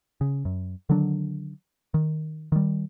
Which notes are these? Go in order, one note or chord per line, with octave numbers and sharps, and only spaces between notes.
C#3
F#2
D3 D#3 F#3 D4
D#3
D#3 G3